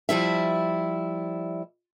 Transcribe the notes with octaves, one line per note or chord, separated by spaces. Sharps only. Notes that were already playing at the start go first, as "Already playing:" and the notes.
F3 G3 E4 E5